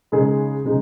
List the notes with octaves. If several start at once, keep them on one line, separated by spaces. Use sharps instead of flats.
C#3 G#3 D#4 G#4
C#3 G#3 D#4